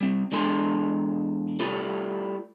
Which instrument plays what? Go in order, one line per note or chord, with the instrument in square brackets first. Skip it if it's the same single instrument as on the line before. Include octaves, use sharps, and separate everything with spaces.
[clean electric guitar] G3 C4
E2 G#3 D4 A4 C6
G3 A3 E4 F4 A4